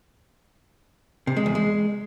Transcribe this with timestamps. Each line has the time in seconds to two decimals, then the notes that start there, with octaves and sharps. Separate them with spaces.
1.27 C3
1.37 G#3
1.46 E2
1.55 G#3